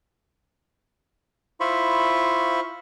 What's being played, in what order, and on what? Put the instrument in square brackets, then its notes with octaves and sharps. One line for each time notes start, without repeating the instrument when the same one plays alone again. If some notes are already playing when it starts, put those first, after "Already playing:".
[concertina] E4 F4 C5 B5 C#6